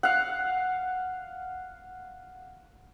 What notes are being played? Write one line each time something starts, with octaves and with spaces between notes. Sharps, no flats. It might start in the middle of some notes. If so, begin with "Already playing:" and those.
F5 F#5